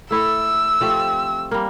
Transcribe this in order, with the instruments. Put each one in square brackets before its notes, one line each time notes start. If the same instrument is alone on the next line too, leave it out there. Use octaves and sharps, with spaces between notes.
[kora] A3 E4 A4 [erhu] E6
[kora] F3 A3 C4 G4
G3 A#3